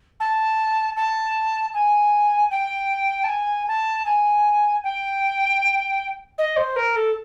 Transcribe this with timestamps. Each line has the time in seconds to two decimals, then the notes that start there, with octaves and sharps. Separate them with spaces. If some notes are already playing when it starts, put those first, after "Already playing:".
0.20 A5
0.96 A5
1.74 G#5
2.51 G5
3.24 A5
3.28 G#5
3.68 A5
4.05 G#5
4.84 G5
6.38 D#5
6.56 C5
6.76 A#4
6.96 A4